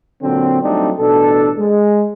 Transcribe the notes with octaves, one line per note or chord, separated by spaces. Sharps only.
A#2 D3 F#3 C4
F#3 G3 A3 C4 D4 D#4
A1 B2 D4 A4
G#3